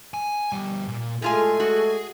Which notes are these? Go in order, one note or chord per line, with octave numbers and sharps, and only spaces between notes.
G#5
D2 G3
A#2
A2 G#3 A3 F4 G#4 A4 G#5
F#4